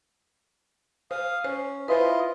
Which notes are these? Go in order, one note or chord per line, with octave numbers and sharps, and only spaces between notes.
C5 F5 D#6
C#4 C5
E4 F4 B4 C5 D#5